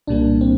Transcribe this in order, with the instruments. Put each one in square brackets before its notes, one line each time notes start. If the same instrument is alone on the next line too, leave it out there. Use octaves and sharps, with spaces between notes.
[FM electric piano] C2 A#2 G3 A#3 D4
C4